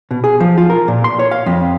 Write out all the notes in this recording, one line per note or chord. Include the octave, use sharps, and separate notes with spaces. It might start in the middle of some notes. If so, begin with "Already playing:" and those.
B2
G#4
F3
F4
A#4
A#2
C6
C#5
F5
F2